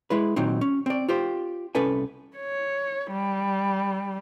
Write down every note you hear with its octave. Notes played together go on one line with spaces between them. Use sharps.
G#3 E4 B4
A#2 D#3 F#3 C4 D#4
C#4
C4 D5
F4 G4 C5
C2 C#4 A4 B4 G#5
C#5
G3